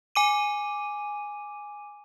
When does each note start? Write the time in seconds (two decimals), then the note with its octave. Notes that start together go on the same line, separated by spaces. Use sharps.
0.15 G#5 D6 D#7